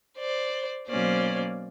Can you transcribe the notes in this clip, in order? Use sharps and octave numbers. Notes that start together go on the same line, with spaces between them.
C5 D5
B2 F#3 A#3 C#4 C5 D5